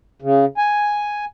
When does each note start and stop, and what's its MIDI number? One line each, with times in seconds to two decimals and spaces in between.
0.22 0.45 49
0.58 1.25 80